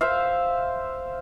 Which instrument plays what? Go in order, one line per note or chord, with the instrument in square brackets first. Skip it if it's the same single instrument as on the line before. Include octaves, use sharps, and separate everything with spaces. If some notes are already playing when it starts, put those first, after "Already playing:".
[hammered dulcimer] C5 E5 F5